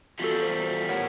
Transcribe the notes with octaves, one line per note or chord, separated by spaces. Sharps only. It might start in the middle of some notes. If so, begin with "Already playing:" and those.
E2 G3 F4 F#4 A4
C5
A2 A#4 C#5 F#5